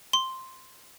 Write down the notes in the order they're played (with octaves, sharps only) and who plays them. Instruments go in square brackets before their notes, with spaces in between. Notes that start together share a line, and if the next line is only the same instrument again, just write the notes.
[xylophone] C6